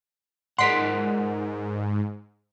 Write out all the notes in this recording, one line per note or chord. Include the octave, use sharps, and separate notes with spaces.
G#2 A#4 D5 F#5 C6 B6